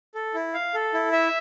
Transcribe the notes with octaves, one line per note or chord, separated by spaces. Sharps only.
A4
E4
F5
A4
E4
E5